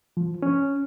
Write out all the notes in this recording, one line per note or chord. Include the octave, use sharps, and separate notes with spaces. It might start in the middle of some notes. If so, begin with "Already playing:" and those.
F3
C#4